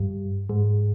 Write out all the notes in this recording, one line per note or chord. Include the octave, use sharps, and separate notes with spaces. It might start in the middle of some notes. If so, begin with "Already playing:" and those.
Already playing: G2
G#2